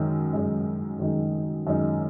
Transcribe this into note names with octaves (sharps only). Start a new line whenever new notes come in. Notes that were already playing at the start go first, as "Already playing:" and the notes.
Already playing: F#2 D#3 G#3 D#4
F#2 D#3 G#3 D#4
F#2 D#3 G#3 D#4
F#2 D#3 G#3 D#4